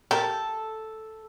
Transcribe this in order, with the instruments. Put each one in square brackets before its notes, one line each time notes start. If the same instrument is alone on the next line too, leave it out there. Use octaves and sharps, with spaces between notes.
[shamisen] G4 A#4 [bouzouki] A4